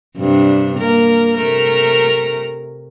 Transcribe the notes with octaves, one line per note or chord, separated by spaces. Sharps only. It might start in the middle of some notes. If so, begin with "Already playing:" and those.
G2 C3 D4
A#3 A#4
C3 A3 A#4